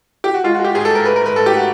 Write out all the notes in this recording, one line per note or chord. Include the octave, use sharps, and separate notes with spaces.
G4
F#4
G#3 F4
F#4
G#3 G4
G#2 G#4
A4
G#2
A#4
A3 B4
A#4
G#2
B4
G#2 A4
G4
A3 F#4